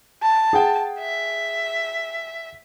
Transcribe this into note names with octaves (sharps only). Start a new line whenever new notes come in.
A5
G#4 F#5 G5
E5